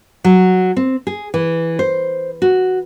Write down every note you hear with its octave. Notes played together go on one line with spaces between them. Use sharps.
F#3
C4
G#4
E3
C5
F#4